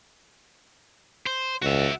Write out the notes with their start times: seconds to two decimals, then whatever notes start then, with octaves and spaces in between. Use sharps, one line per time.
1.26 C5
1.62 C#2 F#4 E5